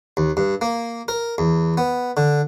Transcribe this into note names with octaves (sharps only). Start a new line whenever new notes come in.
D#2
G2
A#3
A#4
E2
B3
D3